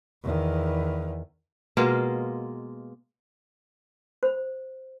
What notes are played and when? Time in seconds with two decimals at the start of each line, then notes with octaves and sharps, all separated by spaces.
0.24 E2 D#3
1.77 B2 G#3 A#3 F4
4.23 C5